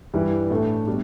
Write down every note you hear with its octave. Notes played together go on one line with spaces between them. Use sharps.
G2 E3 G3 E4 B4
A2 A3 D4 A4
B2 G3 D4